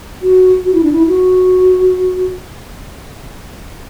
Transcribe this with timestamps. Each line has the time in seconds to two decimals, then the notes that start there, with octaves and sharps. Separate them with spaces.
0.22 F#4
0.65 F#4
0.74 E4
0.83 D4
0.93 E4
1.08 F#4